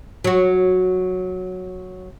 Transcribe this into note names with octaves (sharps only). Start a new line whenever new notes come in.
F#3 F#4